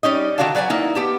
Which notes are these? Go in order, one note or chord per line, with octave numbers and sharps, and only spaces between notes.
G3 C#4 D#4 D#5
D3 D#3 F#4 D5 F5 A5
F#3 B4 D5 F#5 G#5
A#3 D#4 E4
B3 G4 A5